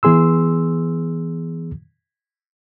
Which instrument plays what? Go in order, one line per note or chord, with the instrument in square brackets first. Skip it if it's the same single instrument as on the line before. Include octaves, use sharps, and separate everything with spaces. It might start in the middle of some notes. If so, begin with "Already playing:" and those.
[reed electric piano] E3 B3 G#4 C6 E6